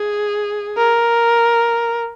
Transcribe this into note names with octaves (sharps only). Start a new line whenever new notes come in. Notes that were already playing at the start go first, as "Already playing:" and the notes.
Already playing: G#4
A#4